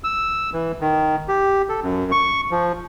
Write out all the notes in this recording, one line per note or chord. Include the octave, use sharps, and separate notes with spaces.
E6
E3
D#3
G4
A4
F#2
C#6
F3